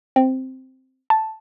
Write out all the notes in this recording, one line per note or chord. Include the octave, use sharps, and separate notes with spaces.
C4
A5